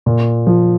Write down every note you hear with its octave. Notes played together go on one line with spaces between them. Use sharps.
A#2
F3